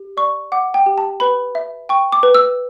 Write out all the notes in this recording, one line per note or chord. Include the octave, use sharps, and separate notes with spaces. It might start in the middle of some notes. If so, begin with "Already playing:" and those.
Already playing: G4
D5 C#6
F#5 D6
G5
G4
A5
B4 B5
E5
G5 C#6
D6
B4
E6